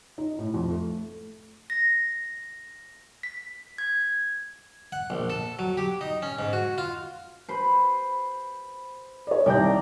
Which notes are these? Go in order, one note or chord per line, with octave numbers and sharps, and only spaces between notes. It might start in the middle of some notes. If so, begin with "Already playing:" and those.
D#4
A2
F2
A3
A#6
B6
G#6
F#5
A#1
A4
F#3
G4
D#4
C#4
G#2
F#4
F4
B4 C5
C#5 D5
C2 D#3 D5 G5 A#5 G6